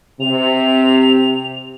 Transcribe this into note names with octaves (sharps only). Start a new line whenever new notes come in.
C3 F7